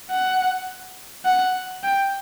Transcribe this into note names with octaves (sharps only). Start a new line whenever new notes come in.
F#5
F#5
G5